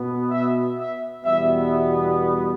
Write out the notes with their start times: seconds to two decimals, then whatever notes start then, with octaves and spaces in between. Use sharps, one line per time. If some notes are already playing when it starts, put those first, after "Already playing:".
Already playing: B2 B3
0.30 E5
0.78 E5
1.25 E2 B2 G3 B3 E5